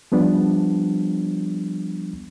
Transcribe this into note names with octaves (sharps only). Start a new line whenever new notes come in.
F3 G3 B3 D4